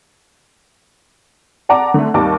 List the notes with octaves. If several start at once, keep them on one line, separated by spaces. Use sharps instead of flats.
D5 F#5 A5 A#5 D6
D3 A3
D#2 D#3 G3 A5 D6